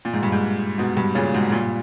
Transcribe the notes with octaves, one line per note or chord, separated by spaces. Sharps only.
A#2
G#2
G2
G#2
G#2 B2
G2
A#2 C#3
G#2 B2
G2 A#2